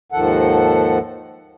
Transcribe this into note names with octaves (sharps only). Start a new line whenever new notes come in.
D#2 G#2 D#3 F3 A4 F#5